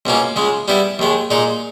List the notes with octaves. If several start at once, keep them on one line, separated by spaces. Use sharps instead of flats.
C#2 B2 A#3 C#4
C#2 C#3 G#3
G3 B3 E4
D#2 D#3 G#3
A#2 G#3 D#4